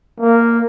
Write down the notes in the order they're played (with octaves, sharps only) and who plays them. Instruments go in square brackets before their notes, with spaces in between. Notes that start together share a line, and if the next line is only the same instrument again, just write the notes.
[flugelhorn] A#3